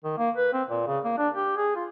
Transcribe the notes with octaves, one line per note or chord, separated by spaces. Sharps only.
D#3
A#3
B4
C4
A#2
C#3
A#3
D4
G4
G#4
F4